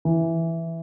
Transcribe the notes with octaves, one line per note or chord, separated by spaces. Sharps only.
E3